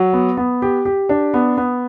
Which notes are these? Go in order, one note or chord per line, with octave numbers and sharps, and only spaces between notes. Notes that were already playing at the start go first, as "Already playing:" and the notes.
Already playing: F#3
B3
B3
G4
G4
D4
B3
B3